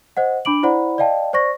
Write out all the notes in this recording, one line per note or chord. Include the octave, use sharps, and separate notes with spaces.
C5 D#5 F#5
D4 B5 D6 D7 F#7
E4 C5 D5 F#5 B5
D5 D#5 F5 G5 A5
C5 D5 C#6 A#6